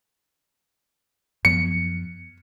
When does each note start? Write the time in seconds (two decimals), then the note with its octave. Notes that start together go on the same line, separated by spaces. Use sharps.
1.45 F#2 F3 B3 C#7